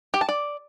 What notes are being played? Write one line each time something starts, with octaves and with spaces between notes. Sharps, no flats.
G4
A5
D5